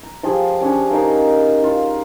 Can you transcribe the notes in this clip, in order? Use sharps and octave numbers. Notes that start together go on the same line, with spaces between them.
A#5
F3 F4 G4 G#4
C#4 D4 G#4 C#5
D#4 A#4 D#5 F5
F4